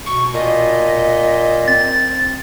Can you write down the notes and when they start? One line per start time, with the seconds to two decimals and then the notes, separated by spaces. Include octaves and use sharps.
0.06 B2 C#6
0.34 A#2 D#5
1.68 C4 A6